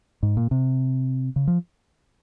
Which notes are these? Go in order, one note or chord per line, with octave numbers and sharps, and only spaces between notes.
G#2
A#2
C3
C#3
F3